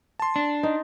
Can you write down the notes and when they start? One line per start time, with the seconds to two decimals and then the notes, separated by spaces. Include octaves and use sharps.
0.20 A5 C6
0.36 D4
0.63 D#4